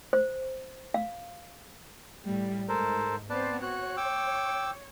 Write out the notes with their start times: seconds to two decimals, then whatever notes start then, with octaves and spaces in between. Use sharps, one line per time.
0.13 C5
0.94 F5
2.25 A2 G3
2.69 G#2 A4 A#4 C5
3.30 B3 C4 B4 C5 D5 A5
3.62 F#4 C#5 F#6
3.97 G5 D6 E6